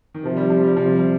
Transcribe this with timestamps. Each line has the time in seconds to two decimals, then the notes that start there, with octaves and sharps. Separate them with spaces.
0.14 D#3
0.24 C3 F3
0.37 G3
0.50 F3
0.64 G3
0.77 C3 F3
0.95 G3